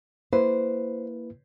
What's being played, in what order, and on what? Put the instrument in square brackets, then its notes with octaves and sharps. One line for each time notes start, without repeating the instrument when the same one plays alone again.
[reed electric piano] A#3 E4 B4 [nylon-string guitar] C5